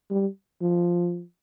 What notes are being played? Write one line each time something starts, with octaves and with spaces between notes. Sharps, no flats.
G3
F3